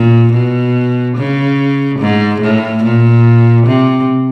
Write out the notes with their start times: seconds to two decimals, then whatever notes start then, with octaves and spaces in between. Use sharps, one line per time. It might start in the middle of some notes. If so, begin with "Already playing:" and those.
Already playing: A#2
0.33 B2
1.17 C#3
1.99 G#2
2.41 A2
2.84 A#2
3.67 C3